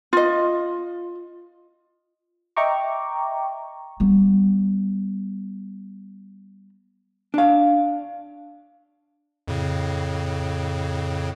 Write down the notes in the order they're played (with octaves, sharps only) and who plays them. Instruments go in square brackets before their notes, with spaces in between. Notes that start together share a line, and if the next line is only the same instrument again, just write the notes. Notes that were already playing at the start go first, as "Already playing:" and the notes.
[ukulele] F4 D#5
[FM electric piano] D#5 E5 G5 A#5 C#6 D6
[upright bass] G3 B3
[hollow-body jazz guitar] D4 F5
[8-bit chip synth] F2 A2 C#3